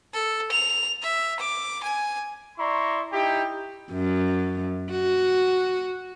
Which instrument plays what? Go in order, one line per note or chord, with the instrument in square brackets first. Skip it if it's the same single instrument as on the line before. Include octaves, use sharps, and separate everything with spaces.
[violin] A4
F7
E5
D6
G#5
[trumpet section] E4 D5 A#5 C6 C#6
D#4 E4 G4
[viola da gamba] F#2
F#4